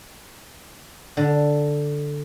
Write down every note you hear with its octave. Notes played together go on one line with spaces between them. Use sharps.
D3